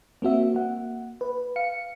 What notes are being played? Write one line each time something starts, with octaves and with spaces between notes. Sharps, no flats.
A#3 C4 F#4 E5
A#3 F#5
B4
F5 C#7